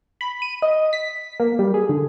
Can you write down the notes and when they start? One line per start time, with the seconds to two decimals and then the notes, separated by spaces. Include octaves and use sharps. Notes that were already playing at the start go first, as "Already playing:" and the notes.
0.21 B5
0.42 D#7
0.62 D#5
0.93 B6
1.40 A#3
1.59 G3
1.74 G#4
1.89 D3